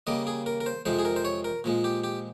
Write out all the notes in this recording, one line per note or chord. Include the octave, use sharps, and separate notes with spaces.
C#3 G3 A#3 D#5
G#4
A#4
A#4
C5
F2 C3 F3 G#3 C5
G#4
A#4
C5
C#5
A#4
A#2 F3 G#3
G4
G4